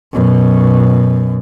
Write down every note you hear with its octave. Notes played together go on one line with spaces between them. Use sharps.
F#2 B2